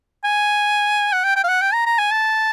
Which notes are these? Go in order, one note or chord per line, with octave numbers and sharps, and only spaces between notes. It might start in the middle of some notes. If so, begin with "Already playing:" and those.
G#5
F#5
G5
G5
F5
F#5
G5
A#5
A#5
G#5
A5